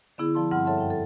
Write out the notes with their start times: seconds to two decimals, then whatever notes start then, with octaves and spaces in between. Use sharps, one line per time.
0.18 D3 B3 E4 G#4
0.35 F3 D5 A5 C6
0.51 G2 G3 C4 F#5 C6 F6
0.65 A4 C#5 E5 F#5 A5 C6
0.77 F#2 G5
0.90 A4